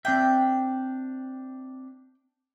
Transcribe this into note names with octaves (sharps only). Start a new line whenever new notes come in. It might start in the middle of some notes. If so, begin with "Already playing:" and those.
C4 D4 E5 G5